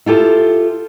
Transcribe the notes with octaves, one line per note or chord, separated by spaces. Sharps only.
E4 F4 G4 A4